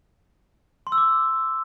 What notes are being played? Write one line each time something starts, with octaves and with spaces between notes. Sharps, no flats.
C6
E6
D6